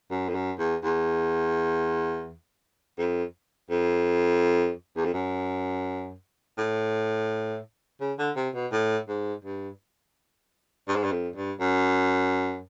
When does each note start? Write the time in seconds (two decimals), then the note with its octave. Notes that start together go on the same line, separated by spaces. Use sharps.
0.11 F#2
0.29 F2
0.35 F#2
0.59 E2
0.83 E2
2.98 F2
3.70 F2
4.96 E2
5.05 F2
5.14 F#2
6.58 A2
8.00 C#3
8.18 D3
8.36 C3
8.54 B2
8.72 A2
9.08 G#2
9.44 G2
10.88 G2
10.96 G#2
11.04 G2
11.12 F2
11.36 G2
11.60 F#2